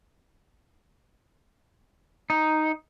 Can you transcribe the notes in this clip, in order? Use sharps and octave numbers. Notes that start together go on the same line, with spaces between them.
D#4